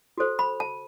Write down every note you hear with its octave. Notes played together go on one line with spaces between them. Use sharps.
F#4 A4 C5
B5
A5